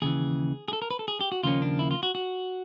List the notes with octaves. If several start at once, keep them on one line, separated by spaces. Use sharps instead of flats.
D#2 C#3 E3 G#4
G#4
A4
A#4
B4
A4
G#4
G4
F#4
D#2 C#3 F3 A#3 C#4 F4
D4
E4
F4
F#4
F#4